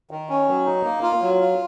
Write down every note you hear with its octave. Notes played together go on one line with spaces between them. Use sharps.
D#3
C#4
F#3
D#4
A#3
F4
F#3
F4